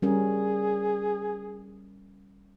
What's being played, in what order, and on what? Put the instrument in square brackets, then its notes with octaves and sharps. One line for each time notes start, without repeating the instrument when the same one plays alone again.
[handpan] G3 C#4 A#4 [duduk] G#4